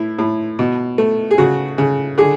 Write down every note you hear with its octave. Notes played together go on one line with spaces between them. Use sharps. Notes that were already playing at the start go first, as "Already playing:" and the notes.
Already playing: A2 E4
A2
B2
A3
G#4
C#3 F#4
C#3
D3 G#4